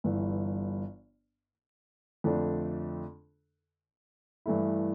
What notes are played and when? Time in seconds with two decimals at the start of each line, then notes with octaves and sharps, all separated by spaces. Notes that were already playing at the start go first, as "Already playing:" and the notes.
0.04 G1 G2 E3
2.24 F2 D3 A3 D4
4.46 G2 E3 A3 E4